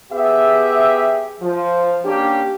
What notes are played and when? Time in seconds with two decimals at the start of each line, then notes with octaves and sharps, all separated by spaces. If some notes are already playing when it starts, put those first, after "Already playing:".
0.11 B3 G4 G#4 E5
1.41 F3
2.05 A#3 C#4 D4 G4